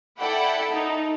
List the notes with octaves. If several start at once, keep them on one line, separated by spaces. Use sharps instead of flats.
E4 A4 D5 F#5 G5 B5
D#4 A4